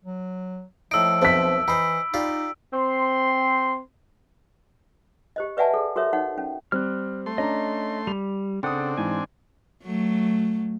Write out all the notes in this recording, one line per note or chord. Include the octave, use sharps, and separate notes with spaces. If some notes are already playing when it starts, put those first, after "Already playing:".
F#3
A2 F3 D#4 E6 D7
B1 B2 A3 C4 B6
E3 D#4 C5 B5
D#4 F4 G4 D5
C4 C6
G4 C5 D#5
B4 D5 E5 F#5 G#5 A5
G#4 A4
F#4 A4 A#4 C#5 E5
D#4 C#5 F#5
C#4
G3 C4 F6 F#6
A3 C6
C#4 D4 D#5 A#5
G3 F7
C#3 C4 D4 A4 F#5 G5 D#6
G#2 E3 G#5
F#3 A3